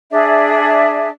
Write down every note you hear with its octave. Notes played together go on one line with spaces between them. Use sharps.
D4 G#4 D5 E5